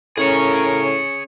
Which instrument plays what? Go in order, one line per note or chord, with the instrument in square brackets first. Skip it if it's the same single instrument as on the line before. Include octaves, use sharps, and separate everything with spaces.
[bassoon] A2 [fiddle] C#4 [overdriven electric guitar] G#4 C#5 [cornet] A#4